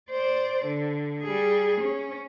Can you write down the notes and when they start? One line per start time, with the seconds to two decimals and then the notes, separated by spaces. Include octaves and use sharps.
0.11 C5 D5
0.65 D3
1.23 G3 G#4
1.81 C#4